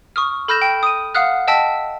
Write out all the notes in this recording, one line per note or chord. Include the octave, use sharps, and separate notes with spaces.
C#6 D#6 F6
A4 B5 F6 G6 A#6 E7
G5
D#6 D#7
F5 F#5 D#6 F6 F#6
D#5 G5 A5 E6 B6